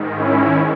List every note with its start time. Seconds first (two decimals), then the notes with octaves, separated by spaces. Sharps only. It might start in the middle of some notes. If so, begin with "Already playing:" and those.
Already playing: G#2 D#3
0.18 C#4 E4